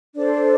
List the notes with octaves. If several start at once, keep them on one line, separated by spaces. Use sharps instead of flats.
D4 A4 C5 D5